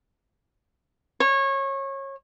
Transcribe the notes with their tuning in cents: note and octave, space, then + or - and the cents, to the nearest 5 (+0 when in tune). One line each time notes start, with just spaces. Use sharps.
C#5 -25